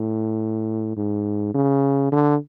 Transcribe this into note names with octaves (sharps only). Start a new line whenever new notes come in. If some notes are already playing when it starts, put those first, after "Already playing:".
Already playing: A2
G#2
C#3
D3